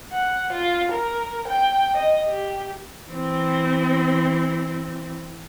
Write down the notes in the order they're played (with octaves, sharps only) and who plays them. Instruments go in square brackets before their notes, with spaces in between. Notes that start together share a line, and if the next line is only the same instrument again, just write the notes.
[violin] F#5
F4
A#4
G5
D#5
G4
[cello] E3 C4